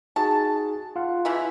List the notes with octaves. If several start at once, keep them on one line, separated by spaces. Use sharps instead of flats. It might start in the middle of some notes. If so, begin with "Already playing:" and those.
D#4 F#4 G#4 A5
F4 F5 F#5
C#3 E3 E4